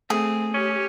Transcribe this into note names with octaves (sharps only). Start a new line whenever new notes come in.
A3 C4 G#4
C#4 G4